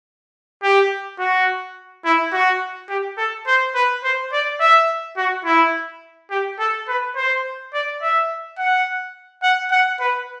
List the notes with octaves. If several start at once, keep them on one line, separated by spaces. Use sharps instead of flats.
G4
F#4
E4
F#4
G4
A4
C5
B4
C5
D5
E5
F#4
E4
G4
A4
B4
C5
D5
E5
F#5
F#5
F#5
B4